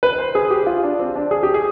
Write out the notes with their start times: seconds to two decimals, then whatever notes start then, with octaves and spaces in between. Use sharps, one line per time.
0.03 B4
0.18 C5
0.35 G#4
0.51 G4
0.66 F4
0.83 D4
0.99 C4
1.15 D4
1.31 G#4
1.43 G4
1.54 G#4